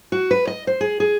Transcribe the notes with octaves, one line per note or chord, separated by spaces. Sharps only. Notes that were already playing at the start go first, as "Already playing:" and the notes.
F#4
B4
D#5
C5
G#4
G#4